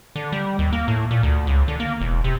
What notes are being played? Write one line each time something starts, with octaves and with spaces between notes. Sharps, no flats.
D3
G3
D#2
A#3
A2
A#2
D2
C#2
D3
A#3
E1
C3